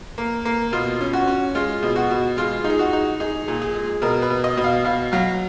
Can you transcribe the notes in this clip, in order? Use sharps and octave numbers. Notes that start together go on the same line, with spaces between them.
A#3
A#3
B2 F4
C#4
F#4
C#4
G#3 F4
B2
F#4
B2
G#3 F4
D#4
G#4
F#4
D#4
D#4 G#4
A#2
G#4
G#3
B2 A#4
B4
B2
D#5
B2
F5
B2 F5
F#3 F5